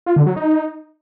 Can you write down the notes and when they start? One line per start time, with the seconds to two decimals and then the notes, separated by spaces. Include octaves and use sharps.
0.06 F4
0.16 D3
0.26 F#3
0.36 D#4